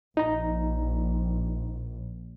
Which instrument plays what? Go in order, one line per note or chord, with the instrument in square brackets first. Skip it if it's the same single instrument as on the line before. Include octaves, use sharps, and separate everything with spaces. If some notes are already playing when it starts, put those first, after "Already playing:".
[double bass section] A#1 [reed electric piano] D#4 A#5